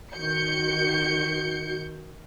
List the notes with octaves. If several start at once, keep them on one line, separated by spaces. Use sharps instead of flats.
D#3 F#4 G6 C#7